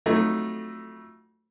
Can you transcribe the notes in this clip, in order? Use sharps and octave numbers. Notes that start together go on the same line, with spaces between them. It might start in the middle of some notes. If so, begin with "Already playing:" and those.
F2 F#3 A3 D#4